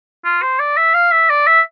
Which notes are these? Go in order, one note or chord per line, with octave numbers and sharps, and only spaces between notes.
F4
C5
D5
E5
F5
E5
D5
E5